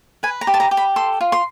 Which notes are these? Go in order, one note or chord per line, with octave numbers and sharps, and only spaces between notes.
B4 G#5
A#5
G4
A5
A#5
G4
B5
A4 C6
F4
C6